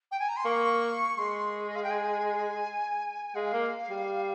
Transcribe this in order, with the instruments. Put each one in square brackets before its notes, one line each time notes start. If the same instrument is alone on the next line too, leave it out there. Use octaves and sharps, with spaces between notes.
[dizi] G5
G#5
A#5
C6
[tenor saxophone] A#3 [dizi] C#6
[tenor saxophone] G#3 [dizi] C6
[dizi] D#5
F5
G5
G#5
[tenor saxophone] G#3 [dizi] F5
[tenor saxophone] A#3
G3